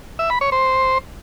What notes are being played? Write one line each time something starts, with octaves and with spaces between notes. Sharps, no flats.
E5
B5
C#5
C5